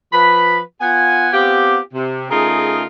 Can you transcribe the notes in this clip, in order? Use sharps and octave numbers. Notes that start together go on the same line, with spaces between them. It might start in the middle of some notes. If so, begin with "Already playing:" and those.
F3 B4 B5
B3 F4 F#5 G#5
B3 C4 F4 G4
C3
C#3 A3 D#4 F4 G#4 A#4